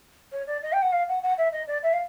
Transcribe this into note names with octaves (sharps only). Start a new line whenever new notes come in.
C#5
D5
D#5
G5
F#5
F5
F#5
F#5
E5
D#5
D5
E5
F5